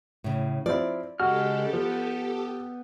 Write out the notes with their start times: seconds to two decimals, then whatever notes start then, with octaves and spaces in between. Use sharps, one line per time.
0.24 A2 C#3
0.66 F3 C4 E4 D5
1.20 C#3 G#3 F#4 G4 A4 F6
1.73 F3 B3